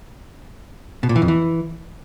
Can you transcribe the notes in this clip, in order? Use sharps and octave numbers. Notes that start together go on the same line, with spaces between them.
B2
A#2
E3
F2
E3